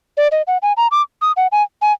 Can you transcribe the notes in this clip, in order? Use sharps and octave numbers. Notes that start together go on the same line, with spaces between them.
D5
D#5
F#5
G#5
A#5
D6
D#6
F#5
G#5
G#5